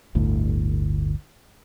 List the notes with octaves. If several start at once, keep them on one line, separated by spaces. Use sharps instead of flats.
G1 D2 A2